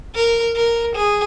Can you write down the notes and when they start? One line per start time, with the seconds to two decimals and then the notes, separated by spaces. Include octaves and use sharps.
0.15 A#4
0.56 A#4
0.96 G#4